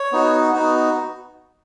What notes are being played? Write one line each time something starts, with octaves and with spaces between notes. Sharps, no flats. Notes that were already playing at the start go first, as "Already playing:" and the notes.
Already playing: C#5
B3 D#4 F#4
B3 D#4 F#4